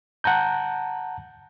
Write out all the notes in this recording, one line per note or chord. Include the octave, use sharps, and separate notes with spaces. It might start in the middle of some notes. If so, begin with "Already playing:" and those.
F#5 A5 A#5 G6